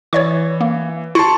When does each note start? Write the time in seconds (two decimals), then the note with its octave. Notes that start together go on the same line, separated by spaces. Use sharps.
0.13 E3 C#5 D5 C#6
0.61 A#3
1.15 E4 A5 C6 C#6